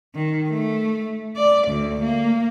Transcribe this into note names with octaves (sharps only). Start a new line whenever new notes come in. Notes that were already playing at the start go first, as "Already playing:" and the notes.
D#3
A3
D5
D2
A#3